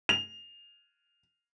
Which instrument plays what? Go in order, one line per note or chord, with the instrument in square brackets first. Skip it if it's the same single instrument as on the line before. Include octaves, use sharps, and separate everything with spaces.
[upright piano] F7